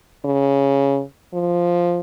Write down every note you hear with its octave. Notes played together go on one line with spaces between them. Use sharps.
C#3
F3